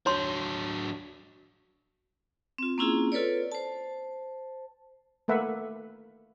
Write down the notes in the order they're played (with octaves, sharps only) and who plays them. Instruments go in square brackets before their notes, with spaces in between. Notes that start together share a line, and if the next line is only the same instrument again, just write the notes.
[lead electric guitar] F#3 D4 [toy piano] C#5 C6
[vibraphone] C4 F4
A#3 C4 C#4 E4 F4 G#4
F4 A4 B4 C#5 D5
C5 A5
[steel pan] A3 A#3 B4 E5 F#5